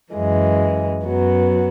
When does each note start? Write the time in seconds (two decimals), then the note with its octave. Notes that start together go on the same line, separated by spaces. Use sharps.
0.14 F#2 E3 G#3
1.05 F#2 F#3 B3